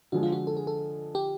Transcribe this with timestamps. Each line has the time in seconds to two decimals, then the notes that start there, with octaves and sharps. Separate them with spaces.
0.12 D3 F3 G#3 F#4
0.23 F4
0.32 F#4
0.47 A4
0.57 G#4
0.67 A4
1.15 G4